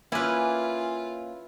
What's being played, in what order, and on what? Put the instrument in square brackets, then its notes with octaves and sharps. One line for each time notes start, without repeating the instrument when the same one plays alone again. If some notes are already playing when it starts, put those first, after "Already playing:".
[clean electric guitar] A#3 C#4 [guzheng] E4 B4 [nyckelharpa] F4 [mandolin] G#5